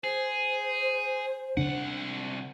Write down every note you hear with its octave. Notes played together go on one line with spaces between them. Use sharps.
G#4 C5
C2 C#3 D4 F#5